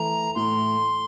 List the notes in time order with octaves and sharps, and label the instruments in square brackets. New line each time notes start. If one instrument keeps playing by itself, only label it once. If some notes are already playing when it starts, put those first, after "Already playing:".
Already playing: [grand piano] E3 A3 E4 [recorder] A#5
[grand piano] A2 [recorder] C6